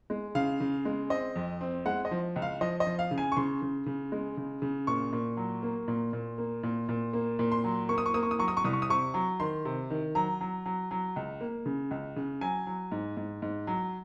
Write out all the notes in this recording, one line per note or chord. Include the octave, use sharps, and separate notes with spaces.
G#3
C#3 F5
C#3
G#3
C4 D#5
F2
C4
G#3 F#5
D#5
F3
C#2
F5
F3 D#5
D#5
F3
F5
C#3
G#5
C#6
C#3 C6
C#3
C#3
G#3
C#3
C#3
A#2 C#6
A#2
F#3
A#3
A#2
A#2
A#3
A#2
A#2
A#3
A#2
C6
F#3
A#3 C#6
D#6
C#6
A#3 D#6
C#6
D#6
F#3 C#6
D#6
C#6
C2 D#6
C#6
D#6
C3 C#6
F#3
D#3 C6
C3
D#3
F#3 A#5
F#3
F#3
F#3
C#2
A#3
C#3
C#2
C#3
F#3 G#5
F#3
G#2
G#2
G#2
F#3